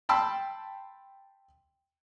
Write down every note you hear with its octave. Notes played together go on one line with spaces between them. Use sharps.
G5 A5 B5 C6 E6